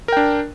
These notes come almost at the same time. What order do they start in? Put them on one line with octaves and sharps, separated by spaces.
A#4 G5 D4